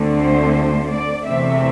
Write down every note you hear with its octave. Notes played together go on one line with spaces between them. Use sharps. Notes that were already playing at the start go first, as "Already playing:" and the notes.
Already playing: D2 D3 A3 C4
C5
D5
E2 C3 E3 A3 C4 E5